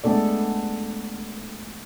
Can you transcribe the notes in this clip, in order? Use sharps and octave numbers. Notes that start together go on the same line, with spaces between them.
G#3 A3 B3 D4 A4 D5